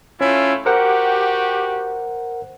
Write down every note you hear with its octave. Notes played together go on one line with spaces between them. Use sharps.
A3 C#4 E4 F4
F#4 G4 A#4 C5 F#5